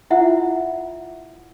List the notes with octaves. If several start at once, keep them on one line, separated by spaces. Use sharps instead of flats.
E4 F4 E5 F#5